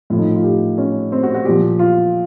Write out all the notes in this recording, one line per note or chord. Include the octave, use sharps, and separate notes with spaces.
A2 F3
D#4
F4
G4
C#4
C4
F#4
F#4
A#2 F3 G4
F4